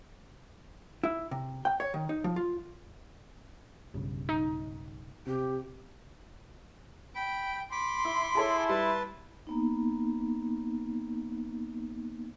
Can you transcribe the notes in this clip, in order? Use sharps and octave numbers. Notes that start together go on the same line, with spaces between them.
E4
C3
G5
C#5
D#3
D#4
F3
F4
B1 G2 C#3
D#4
C3 G4
G5 B5
B5 C6 D6
E4
E4 G#4 A4 C#5
G3 B4 A5
A#3 B3 D#4